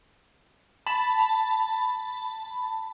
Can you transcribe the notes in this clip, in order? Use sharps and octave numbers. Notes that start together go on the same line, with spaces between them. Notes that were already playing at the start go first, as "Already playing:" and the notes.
A5 B5